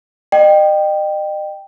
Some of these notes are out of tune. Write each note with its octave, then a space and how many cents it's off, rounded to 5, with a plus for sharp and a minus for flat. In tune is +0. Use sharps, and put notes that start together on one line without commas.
D#5 -35 G5 +0